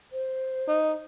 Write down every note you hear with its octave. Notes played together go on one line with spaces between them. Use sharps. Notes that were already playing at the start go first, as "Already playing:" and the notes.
C5
D#4